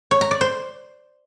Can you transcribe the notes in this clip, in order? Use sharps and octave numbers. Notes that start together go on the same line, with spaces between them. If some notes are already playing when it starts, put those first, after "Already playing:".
C#5
A#5
D5
C5